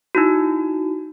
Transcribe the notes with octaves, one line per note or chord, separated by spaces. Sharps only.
D#4 E4 F#4